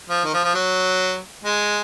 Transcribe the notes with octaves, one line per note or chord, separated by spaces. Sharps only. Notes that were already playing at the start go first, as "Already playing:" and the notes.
F3
D#3
F3
F3
F#3
G#3